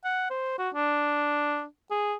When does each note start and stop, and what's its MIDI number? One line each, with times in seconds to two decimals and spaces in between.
0.05 0.27 78
0.31 0.58 72
0.59 0.70 66
0.75 1.65 62
1.91 2.15 68